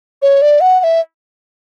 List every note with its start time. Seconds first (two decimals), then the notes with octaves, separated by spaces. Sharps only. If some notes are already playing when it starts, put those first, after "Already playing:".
0.22 C#5
0.42 D5
0.61 F#5
0.80 F#5
0.84 E5